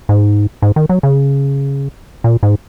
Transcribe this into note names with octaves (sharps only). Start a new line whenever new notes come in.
G#2
G#2
D#3
F#3
C#3
A#2
G#2